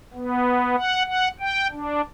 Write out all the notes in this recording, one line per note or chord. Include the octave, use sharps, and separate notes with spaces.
B3
F#5
F#5
G5
D4